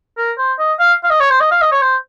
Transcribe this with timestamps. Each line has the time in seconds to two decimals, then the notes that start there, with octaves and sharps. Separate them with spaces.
0.17 A#4
0.38 C5
0.59 D#5
0.79 F5
1.03 F5
1.10 D#5
1.20 C#5
1.30 C5
1.40 D#5
1.51 F5
1.61 D#5
1.71 C#5
1.82 C5